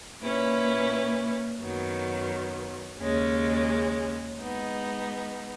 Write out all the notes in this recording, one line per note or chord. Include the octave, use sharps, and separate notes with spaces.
A#2 A#3 C#4 E4 B4
F#2 D#3 F#3 B3
D#2 C#3 G#3 C#4
G#3 B3 D#4